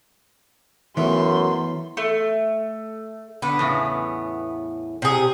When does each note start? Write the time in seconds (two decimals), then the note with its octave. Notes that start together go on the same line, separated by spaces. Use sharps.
0.97 F#2 E3 A3 B3 C#4 C6
1.97 A3
3.42 D3 B3
3.59 E2 A2 C#3
5.02 C3 G#4